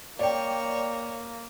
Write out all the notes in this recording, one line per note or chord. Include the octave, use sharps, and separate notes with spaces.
A#3 C#5 D5 G5